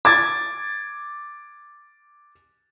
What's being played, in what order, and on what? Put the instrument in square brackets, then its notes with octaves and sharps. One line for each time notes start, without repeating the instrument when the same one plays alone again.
[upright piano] D6 G#6 A6